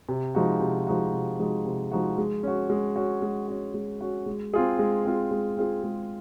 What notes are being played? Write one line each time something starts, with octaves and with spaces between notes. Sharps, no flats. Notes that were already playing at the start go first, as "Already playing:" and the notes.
C3
F3 G#3 D#4 F#4
C3
F3 G#3 D#4 F#4
C3
F3 G#3 D#4 F#4
C3
F3 G#3 D#4 F#4
G#3
C#4 F#4
G#3
C#4 F#4
G#3
C#4 F#4
G#3
C#4 F#4
G#3
C4 F4 G#4
G#3
C4 F4 G#4
G#3
C4 F4 G#4
G#3